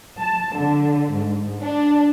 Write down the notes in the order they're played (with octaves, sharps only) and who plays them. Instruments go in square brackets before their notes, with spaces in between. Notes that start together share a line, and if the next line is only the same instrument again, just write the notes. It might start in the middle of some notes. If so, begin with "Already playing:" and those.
[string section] A5
D3
G#2
D4